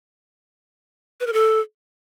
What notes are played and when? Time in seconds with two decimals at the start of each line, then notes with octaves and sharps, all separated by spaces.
1.20 B4
1.27 A#4
1.33 A4